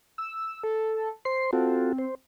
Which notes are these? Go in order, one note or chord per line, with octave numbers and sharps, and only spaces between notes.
E6
A4
C5 C6 C7
C4 F4 F#4 A4
C5